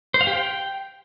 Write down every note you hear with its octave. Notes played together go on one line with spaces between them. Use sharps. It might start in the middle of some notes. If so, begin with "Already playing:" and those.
C5
F5
G4
G5